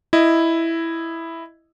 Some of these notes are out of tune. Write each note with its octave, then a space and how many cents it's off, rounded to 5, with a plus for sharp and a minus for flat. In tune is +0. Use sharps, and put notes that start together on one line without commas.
E4 +0 D#5 +0